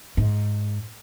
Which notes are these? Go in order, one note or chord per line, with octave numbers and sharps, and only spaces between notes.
G#2